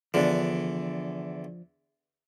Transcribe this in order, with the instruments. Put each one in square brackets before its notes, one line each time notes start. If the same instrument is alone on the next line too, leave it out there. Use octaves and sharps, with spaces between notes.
[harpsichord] E2 D3 [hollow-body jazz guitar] F3 D4